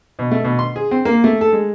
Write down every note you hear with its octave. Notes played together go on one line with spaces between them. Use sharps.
B2
A3
B2
C6
G#4
C4
A#3
A3
A4
G#3